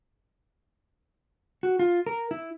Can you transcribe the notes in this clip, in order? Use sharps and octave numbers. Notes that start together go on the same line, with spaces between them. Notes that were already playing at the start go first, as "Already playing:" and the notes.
F#4
F4
A#4
E4